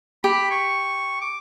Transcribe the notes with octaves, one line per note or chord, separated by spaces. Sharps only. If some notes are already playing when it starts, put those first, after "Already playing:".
G4 B5
C#6
D6